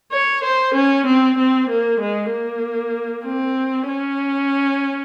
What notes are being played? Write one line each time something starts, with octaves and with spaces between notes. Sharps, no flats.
C#5
C5
C#4
C4
C4
A#3
G#3
A#3
C4
C#4